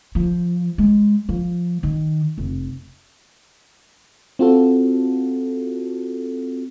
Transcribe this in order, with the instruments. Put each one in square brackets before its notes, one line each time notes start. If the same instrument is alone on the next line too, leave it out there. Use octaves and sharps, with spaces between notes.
[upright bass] F3
G#3
F3
D#3
F1
[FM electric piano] C4 F4 F#4 A4